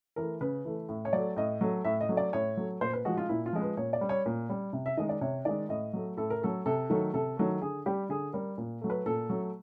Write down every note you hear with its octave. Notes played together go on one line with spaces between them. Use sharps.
E3 A3 A#4
C#3 B4
E3 A3
A2
C#5
F#3 A3 D5
A2 D#5
F#3 A3
A2 E5
D#5
F#3 A3
D5
A2 C#5
F#3 A3
A#2 C5
B4
F3 G#3 F#4
F4
A#2 E4
F4
F3 G#3
B4
A#2 C#5
D5
G3
C#5
A#2
G3
C3
E5
D#3 G#3 D#5
D5
C3 C#5
D#3 G#3 D5
A2 D#5
F#3 A3
A2 A4
A#4
F#3 A3 A4
C3 A4
D#3 F#3 A3
C3 A4
D#3 F#3 A3
D3 G#4
G3 G4
D3 G#4
G3 A#4
A#2
F#3 A3
B4
A#2 A4
F#3 A3